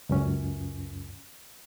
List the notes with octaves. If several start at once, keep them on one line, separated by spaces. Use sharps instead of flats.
C#2 F#2 C#4